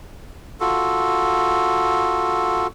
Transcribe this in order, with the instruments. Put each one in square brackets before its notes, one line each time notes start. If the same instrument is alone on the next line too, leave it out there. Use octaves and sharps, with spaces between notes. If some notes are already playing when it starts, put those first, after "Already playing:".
[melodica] F4 F#4 A4